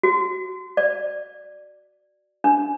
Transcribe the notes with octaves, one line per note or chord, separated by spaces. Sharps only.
F#4
D5
D4